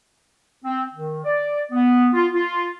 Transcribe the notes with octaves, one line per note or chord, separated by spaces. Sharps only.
C4
D#3
D5
B3
F4
F4